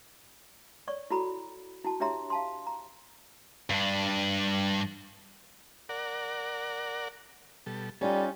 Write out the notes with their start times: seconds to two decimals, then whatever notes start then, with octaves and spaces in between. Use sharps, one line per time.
0.88 C#5 D5 C#6
1.10 E4 F#4 A4 A#5 B5
1.85 E4 F#4 A5
2.00 D4 G4 C#5 E5 A#5 C6
2.30 F5 A5 C6
2.67 A#5
3.70 G2 D4
5.89 A#4 D5 F#5
7.66 B2 G3 A4
8.01 G3 C#4 D#4 F4 A4